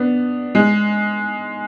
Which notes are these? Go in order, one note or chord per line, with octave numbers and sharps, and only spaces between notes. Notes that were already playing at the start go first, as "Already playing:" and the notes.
Already playing: B3 D4
G#3